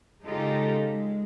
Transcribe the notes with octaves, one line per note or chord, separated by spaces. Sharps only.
C#3 G#3 D#4 F4 G4 A4
G#3